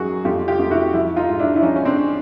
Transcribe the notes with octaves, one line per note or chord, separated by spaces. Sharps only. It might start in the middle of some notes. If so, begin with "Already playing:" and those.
Already playing: F#2 D#3 F#3 F#4 G#4
F2 F4 G4
F4 G4
F2
E4 F#4
F3 E4 F#4
D#4 F4
G#2
D4 E4
E4
F3 C#4 D#4
C#4
C4 D4